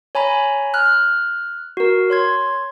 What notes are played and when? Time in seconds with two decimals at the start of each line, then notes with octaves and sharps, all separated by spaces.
0.15 C#5 G#5 A#5 B5
0.74 F6 F#6
1.77 F#4 A#4
2.10 C#5 C6 G#6